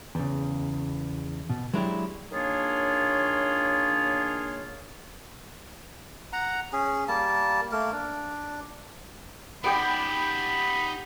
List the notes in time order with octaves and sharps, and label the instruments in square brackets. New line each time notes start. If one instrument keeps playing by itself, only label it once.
[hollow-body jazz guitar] E2 C#3
B2
F#3 G#3 D4 E4 F#4 G4
[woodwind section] D#3 A#3 D4 F4 G#4 C#5
[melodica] F#5 A#5
C#4 G#4
G3 A#3 A5
A3 A#3 A#4
D4
[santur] B3 G4 G5 [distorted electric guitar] D#4 D5 [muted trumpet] B5